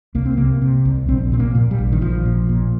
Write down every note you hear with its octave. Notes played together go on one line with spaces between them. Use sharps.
C2 A#3
C4
C3 A#3
C3
C2
A#1 C4
A#2 C4
A#3
A#2
G3
A#1
D#3
A#1 F3
A#2
A#2